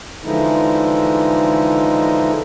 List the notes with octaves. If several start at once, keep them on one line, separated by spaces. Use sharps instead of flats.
D3 E3 F3 G#3 D#4 E4